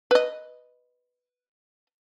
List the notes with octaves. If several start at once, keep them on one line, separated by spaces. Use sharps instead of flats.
B4 D#5